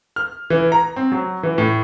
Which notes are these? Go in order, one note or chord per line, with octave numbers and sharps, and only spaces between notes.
F6
E3
A#5
C4
F#3
E3
A2